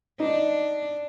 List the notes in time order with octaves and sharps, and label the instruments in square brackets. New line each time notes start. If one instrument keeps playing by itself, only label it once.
[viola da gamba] D4 [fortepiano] D#4